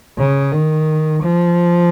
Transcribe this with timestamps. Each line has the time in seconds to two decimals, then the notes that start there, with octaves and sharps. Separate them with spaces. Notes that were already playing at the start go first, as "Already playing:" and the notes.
0.18 C#3
0.52 D#3
1.22 F3